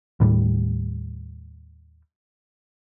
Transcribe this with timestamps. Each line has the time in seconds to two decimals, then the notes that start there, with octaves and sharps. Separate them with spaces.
0.20 D#2 A2 G3